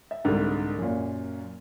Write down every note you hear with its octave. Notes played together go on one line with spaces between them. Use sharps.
E5
C2 G#2 D3
F#2 A#2